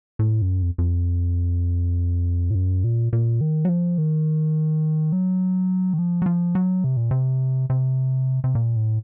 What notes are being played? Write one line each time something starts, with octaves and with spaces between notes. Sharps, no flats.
A2
F#2
F2
F2
A2
F#2
A#2
A#2
D#3
F#3
F3
D#3
F#3
D#3
F3
F#3
F3
F#3
C3
A#2
C3
C3
C3
A#2
A2